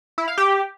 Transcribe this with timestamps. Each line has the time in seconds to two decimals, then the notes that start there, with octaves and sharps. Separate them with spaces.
0.18 E4
0.28 F5
0.38 G4